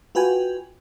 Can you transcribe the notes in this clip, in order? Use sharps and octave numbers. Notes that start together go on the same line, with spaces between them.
F4 F#4 B4 G5 G#5